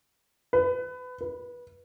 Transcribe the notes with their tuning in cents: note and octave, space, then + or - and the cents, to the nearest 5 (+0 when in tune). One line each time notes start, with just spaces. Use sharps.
B4 +25
B4 -20